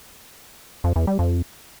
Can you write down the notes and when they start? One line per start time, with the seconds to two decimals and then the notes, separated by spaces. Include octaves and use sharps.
0.84 F2
0.96 E2
1.07 G3
1.19 F2